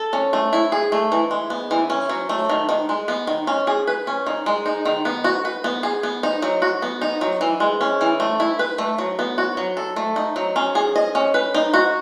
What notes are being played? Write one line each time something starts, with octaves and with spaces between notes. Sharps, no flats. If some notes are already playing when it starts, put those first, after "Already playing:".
Already playing: A4
C#4
A3
E4
G#4
A3
E3
G#3
B3
E3
C#4
F#3
A3
D#3
D#3
G#3
B3
D#3
C#4
G#4
B4
C#4
D#3
G#3
D#4
D#3
B3
F#4
B4
B3
G#4
B3
D#4
F#3
F#4
B3
D#4
F#3
E3
G#3
C#4
E3
A3
E4
B4
A3
F#3
B3
F#4
F#3
A4
A3
D#4
F#3
C#4
G#4
D#5
C#4
B4
D#4
F#4